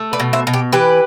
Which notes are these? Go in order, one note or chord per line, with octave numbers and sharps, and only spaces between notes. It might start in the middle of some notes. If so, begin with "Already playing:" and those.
Already playing: A3
B4 D5
B2
C5 E5
B2
G4
E3 G4 B4